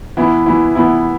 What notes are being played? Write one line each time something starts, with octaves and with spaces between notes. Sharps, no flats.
E3 B3 E4
E3 B3 E4
E3 B3 E4